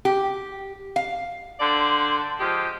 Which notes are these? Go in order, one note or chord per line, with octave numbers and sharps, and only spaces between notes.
G4
F5
D3 C5 D5
F3 G#3 G4